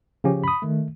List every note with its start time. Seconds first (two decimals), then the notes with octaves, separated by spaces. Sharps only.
0.24 C#3 F3 C#4 G4
0.44 B5 D#6
0.62 D#3 A3